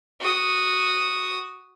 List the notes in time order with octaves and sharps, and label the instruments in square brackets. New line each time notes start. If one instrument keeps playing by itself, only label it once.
[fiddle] F#4 D#6